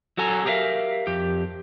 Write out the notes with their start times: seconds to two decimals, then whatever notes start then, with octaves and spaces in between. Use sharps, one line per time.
0.17 F#3 F#4 A4 G#5 A#5
0.45 G4 G#4 A#4 B4 E5 F5
1.07 F2 G4